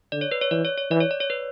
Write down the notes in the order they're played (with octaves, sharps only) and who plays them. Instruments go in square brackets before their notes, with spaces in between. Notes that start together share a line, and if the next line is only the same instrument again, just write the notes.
[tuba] D3 [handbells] D5
[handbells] C#5
B4
C#5
[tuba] E3 [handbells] D5
[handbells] C#5
C#5
[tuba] E3 [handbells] D5
[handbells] C#5
D5
C#5
B4